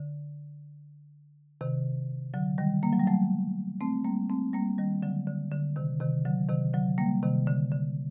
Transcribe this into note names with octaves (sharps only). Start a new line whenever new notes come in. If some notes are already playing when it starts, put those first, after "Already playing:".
Already playing: D3
C3 D#3
D3 F#3
D#3 G3
G3 A#3
F#3
G3
F#3 A3
A3 C4
G3 A#3
A3 C4
G3 A#3
D#3 G3
D3 F#3
D3
D3
C3 D#3
C3 D#3
D3 F#3
C3 D#3
D3 F#3
G3 A#3
C3 D#3
D3
D3